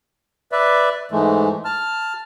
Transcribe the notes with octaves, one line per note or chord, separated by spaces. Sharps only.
B4 D5 E5
G#2 E3 G#3 A3
A5 F6